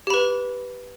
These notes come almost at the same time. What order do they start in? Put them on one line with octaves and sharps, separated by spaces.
G4 B5 B4